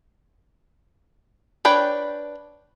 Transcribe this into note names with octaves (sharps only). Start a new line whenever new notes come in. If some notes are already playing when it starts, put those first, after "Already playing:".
D4 B4 C#5 G5